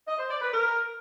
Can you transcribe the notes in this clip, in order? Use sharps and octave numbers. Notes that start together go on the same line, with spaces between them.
D#5
C5
D5
B4
A#4